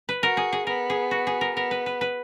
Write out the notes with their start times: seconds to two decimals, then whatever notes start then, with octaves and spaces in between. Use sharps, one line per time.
0.09 B4
0.23 F#4 A#4
0.37 G#4
0.53 G#4
0.67 B3 A#4
0.90 G#4
1.11 F#4
1.27 G#4
1.41 A#4
1.56 B3 A#4
1.71 B4
1.86 B4
2.01 B4